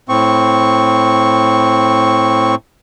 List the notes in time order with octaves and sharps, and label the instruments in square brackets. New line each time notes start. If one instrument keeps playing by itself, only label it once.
[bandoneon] A2 C4 C#6